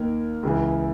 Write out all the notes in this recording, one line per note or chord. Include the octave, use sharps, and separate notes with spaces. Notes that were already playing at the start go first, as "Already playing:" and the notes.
Already playing: D#2 D#3 A#3 A#4
C#2 C#3 E3